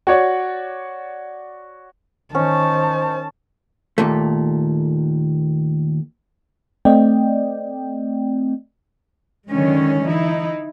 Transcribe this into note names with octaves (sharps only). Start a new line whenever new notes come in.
F#4 C#5 D5
D#3 C#4 C5 A5
D#2 A#2 A3
A3 C4 D5 D#5 G5
D3 D#3 F#3 G#3 C#4
E3 D#4 E4